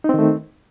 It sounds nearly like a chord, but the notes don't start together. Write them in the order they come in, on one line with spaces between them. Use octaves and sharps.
D#4 C4 D#3 A3